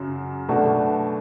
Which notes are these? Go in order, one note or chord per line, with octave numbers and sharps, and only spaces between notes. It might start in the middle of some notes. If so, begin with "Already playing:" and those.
Already playing: F#2 C#3 F#3
B2 A3 D4 F#4